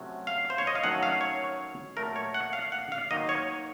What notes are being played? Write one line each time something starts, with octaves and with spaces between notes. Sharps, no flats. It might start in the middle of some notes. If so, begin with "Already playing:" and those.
Already playing: C3 F#3 A3 C#4
F5
C5
C#5
D#5
F5
D#3 F#3 A3 C#4 F#5
F5
C#5
A#2 F#3 A3 A#4
C#5
F#5
F5
F#5
F5
D#3 F#3 A#3 D#5
C#5